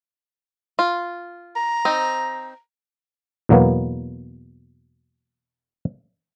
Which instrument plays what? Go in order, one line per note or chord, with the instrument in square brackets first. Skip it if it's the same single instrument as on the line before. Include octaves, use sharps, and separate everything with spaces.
[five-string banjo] F4
[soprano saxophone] A#5
[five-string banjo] C4 D#4
[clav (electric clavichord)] E2 B2 F#3 A#3 B3